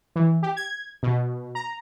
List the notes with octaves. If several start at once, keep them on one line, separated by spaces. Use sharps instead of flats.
E3
G4
G#6
B2
A#5